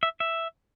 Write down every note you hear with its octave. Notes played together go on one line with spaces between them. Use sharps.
E5
E5